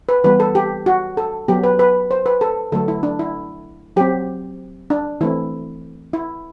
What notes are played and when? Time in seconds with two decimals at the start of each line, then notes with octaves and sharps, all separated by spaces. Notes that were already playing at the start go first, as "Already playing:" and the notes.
0.09 B4
0.24 E3 G3 B3 B4
0.40 A4
0.55 G4
0.86 F#4
1.17 A4
1.48 F#3 B3 G4
1.64 B4
1.79 B4
2.11 C5
2.26 B4
2.41 A4
2.72 D3 F#3 A3 A4
2.88 E4
3.03 D4
3.19 E4
3.96 F#3 C4 G4
4.90 D4
5.21 E3 A3 C4 E4
6.13 E4